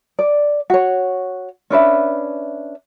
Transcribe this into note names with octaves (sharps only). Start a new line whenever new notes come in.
D5
F#4 C#5
C#4 D4 B4 E5